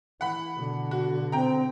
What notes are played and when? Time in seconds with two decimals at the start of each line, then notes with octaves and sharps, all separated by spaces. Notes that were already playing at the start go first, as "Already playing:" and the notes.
0.21 E3 F#5 B5
0.55 B2 D3
0.91 F#4
1.32 C4 G5 A#5